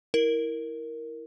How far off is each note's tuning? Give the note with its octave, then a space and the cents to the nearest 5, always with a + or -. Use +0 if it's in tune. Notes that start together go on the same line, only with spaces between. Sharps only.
E4 -10 A#4 +0